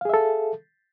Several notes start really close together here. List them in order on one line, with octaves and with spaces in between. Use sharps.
F5 G#4 E5 A4